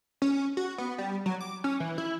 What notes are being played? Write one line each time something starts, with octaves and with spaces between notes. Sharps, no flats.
C#4
F#4
B3
G3
F#3
D6
C#4
E3
E4